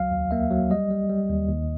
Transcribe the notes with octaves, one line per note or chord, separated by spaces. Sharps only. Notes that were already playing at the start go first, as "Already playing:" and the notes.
Already playing: C#2 F#3 F5
D#2
A#3 E5
F#3
G3 D#5
G3
G3
D#2
D#2